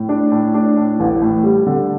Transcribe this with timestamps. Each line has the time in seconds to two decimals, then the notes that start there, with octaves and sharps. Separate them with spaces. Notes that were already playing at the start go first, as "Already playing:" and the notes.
Already playing: A2
0.09 D4
0.31 A2
0.54 D4
0.77 A2
1.00 A1
1.22 A2
1.44 G3
1.66 D3